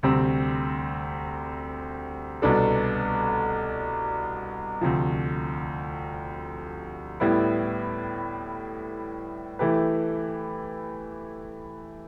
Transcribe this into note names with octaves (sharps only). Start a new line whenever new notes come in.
D2 C3 G3 C4
C2 B2 B3 D4 A4
D2 C3 F3
A2 G3 B3 E4
E3 A3 E4 G4 B4